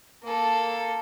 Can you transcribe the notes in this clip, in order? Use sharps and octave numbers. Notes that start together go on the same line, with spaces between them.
A#3 A4